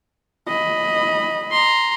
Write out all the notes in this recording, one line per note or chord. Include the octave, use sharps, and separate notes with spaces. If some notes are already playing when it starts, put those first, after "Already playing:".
D#5 B5
A#5 C6